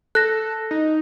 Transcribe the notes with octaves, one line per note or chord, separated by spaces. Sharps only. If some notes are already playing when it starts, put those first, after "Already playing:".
A4 F#6 A#6
D#4